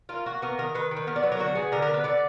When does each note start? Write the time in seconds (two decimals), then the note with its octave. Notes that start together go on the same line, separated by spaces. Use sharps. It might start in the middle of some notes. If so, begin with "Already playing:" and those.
0.09 A#3 F4
0.26 A#3 F#4
0.42 B3 A#4
0.58 D#3 A#4
0.75 D#3 B4
0.91 D#3
0.96 B4
1.07 B3 A#4
1.16 D5
1.22 F#3 B4
1.32 A#4
1.39 D3 F#4
1.55 B3 G#4
1.72 D3 A#4
1.82 A#4
1.88 B3
1.94 B4
2.04 D3 D5